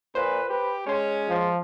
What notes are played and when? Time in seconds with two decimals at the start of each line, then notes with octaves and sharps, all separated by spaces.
0.15 A#2 B4 C5
0.49 G4 B4
0.87 G#3 C#4 C#5 C6
1.29 F3